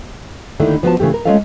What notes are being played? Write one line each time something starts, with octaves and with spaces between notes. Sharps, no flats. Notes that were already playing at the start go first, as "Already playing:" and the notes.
D#2 D3 D#3 A3 E4
F3 B3 F#4 A5
C#3 E3 A3 G4
A#4
G#3 A3 C#4 F4 A4 F5